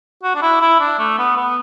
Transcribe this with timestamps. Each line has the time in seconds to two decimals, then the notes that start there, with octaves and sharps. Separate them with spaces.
0.23 F#4
0.35 D4
0.42 E4
0.61 E4
0.80 D4
0.99 A3
1.18 B3
1.36 B3